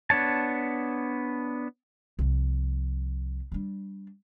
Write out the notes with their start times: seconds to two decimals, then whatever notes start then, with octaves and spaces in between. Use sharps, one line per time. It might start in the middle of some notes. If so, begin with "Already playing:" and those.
0.10 B3 D4 C#5 A5
2.19 C2 F3
3.52 G3 D4